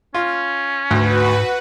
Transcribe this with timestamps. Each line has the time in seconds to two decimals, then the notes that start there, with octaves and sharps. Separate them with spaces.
0.14 C#4 F4
0.91 D2 G#2 F#4 B4